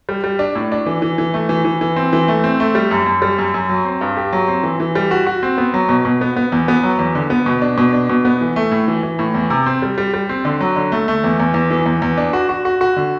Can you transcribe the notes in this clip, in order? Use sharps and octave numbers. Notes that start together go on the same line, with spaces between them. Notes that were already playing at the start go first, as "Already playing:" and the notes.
G3
G3
D4
A2
D4
E3
E3
E3
A3
E3
E3
E3
C4
E3
A3
C4
A3
G3
F#2
F#2
G3
F#2
F#2
F#3
C4
G2
G4
F#3
C4
E3
E3
G3
F#4
F#4
C4
B3
F#3
B2
B2
B3
B3
E2
B3
F#3
E2
D3
B3
B2
D4
B2
D4
B2
B3
E3
A3
A2
E3
E3
A2
E2
C3
C4
G3
G3
G3
C4
D3
F#3
D3
A3
A3
E2
E2
E2
E3
E2
E2
D4
F#4
F#4
F#4
F#4
D3